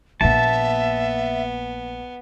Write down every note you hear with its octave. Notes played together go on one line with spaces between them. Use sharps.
A#1 A#3 B3 E5 A5